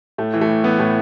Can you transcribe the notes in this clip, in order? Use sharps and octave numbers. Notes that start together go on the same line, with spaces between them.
A2 A3
E3
A3
A2
E3 B3
A2 A3